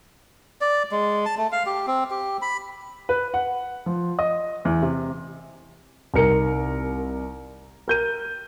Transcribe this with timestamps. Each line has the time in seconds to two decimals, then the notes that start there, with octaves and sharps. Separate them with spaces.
0.61 D5
0.91 G#3
1.25 A5
1.37 A3
1.52 F5
1.66 G4
1.87 C4
2.10 G4
2.42 B5
3.09 B4
3.34 F#5
3.86 F3
4.19 D#5
4.65 E2
4.82 C3
6.14 C2 D#4 A#4 C#7
7.88 A#4 G6 D#7